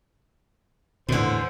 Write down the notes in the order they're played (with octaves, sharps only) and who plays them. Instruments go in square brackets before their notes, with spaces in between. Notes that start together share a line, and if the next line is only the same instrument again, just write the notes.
[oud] E2 D3 [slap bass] A2 [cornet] C5